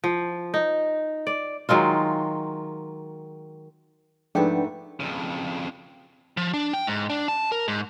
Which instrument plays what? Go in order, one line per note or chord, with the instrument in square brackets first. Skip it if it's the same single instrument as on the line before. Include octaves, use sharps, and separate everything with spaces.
[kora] F3
D#4
D5
D#3 F#3 G#3 F4
[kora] G#2 A3 [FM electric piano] F3 F#5 G5 [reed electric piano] D4 B4
[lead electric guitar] F2 C#3
[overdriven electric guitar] F3
D4
G5
G#2
D4
A5
A#4
G#2